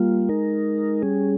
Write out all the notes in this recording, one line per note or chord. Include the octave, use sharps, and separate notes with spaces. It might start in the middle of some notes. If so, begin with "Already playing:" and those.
Already playing: G3 A#3 F4
G#3 D#4 A#4
G3 C#4 G#4